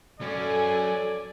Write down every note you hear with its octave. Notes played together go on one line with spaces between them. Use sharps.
F#3 C#4 A4 D5 G#5